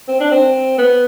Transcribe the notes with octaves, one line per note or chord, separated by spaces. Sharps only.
C4
D4
C4
B3